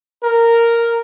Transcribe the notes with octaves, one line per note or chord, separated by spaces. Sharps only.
A#4